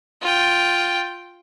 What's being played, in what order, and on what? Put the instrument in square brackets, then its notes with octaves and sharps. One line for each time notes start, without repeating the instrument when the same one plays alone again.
[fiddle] F4 G5